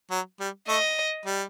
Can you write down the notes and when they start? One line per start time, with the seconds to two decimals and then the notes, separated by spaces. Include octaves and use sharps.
0.11 F#3
0.40 G3
0.68 A3 D#5
1.25 G3